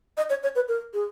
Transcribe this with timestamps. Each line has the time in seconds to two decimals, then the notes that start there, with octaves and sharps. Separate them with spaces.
0.17 D#5
0.30 C#5
0.43 C#5
0.55 B4
0.68 A#4
0.94 G#4